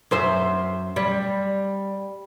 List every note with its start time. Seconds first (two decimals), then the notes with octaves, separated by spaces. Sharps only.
0.11 F#2 C5 E5
0.96 G3